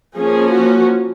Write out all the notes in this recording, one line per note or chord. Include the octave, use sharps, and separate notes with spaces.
F3 A#3 C#4 G#4
F#4